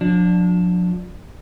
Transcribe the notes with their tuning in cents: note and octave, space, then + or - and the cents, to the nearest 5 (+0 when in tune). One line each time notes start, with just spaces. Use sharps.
F3 +45 D4 +0